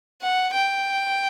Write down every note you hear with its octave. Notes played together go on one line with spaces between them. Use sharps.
F#5
G5